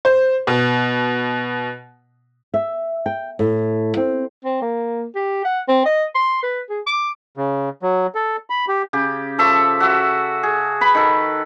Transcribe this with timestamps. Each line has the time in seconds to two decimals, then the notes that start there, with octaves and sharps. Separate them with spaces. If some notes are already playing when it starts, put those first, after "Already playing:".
0.05 C5
0.47 B2
2.54 E5
3.06 G5
3.39 A2
3.97 C4
4.45 C4
4.62 A#3
5.15 G4
5.45 F#5
5.68 C4
5.85 D#5
6.15 C6
6.43 B4
6.69 G#4
6.86 D6
7.37 C#3
7.83 F#3
8.15 A4
8.50 B5
8.68 G4
8.93 C#3 G4
9.38 F3 A4 E5 C#6
9.80 F#4 E5
10.43 G#4
10.81 B4 B5 C#6
10.95 D#3 A4